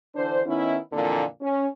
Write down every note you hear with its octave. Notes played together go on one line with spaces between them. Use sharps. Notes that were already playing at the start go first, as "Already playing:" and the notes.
D3 E3 D4 C5
D#3 B3 C#4 D#4 E4
F2 A#2 D3 E3 A#3
C#4